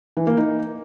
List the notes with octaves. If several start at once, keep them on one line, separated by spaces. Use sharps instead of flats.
E3
A#3
D#4